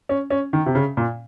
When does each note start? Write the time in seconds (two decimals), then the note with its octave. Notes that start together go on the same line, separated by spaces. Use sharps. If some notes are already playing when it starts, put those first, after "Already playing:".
0.09 C#4
0.30 C#4
0.53 D#3
0.66 C3
0.75 C#3
0.97 A#2